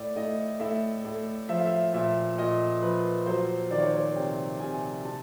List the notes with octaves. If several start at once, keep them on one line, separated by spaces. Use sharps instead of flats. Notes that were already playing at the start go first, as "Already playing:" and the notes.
Already playing: A2 D5
A2 D#5
A2 E5
A2
F3 E5
F5
E5
A#2 E5
A#2 D#5
F3 B4
F#3 C5
D#3 D5
C#5
C5
C#5
C3 G5
C3 G#5
C3 A5